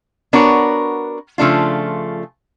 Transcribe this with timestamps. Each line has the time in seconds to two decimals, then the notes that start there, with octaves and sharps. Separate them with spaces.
0.33 B3 D4 F#4 A#4 C#5
1.38 C#3 F3 A3 D4 F4